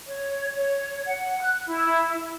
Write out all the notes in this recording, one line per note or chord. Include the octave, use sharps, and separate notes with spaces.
C#5
C#5
F#5
F#6
E4